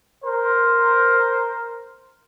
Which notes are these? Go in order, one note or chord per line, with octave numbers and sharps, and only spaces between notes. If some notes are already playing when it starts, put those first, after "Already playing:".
A#4 C5